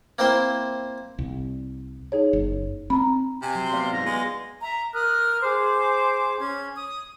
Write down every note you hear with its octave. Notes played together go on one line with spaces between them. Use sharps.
A#3 C4 E4 C5
C2
D#4 G#4 C#5
F#1
C4 A#5 B5
C3 G#5
F#3 C6
B3 D5 F5
G#2 F4 A#6
G#3 B3
E5 A#5
A#4 D#6 F6 F#6
G#4 C5 D6
C#4 G#6
D#6